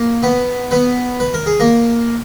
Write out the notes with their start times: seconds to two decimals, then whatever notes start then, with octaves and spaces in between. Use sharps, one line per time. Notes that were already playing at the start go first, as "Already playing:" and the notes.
Already playing: A#3
0.23 B3 B4
0.71 B3 B4
1.20 B4
1.34 A#4
1.46 G#4
1.60 A#3 A#4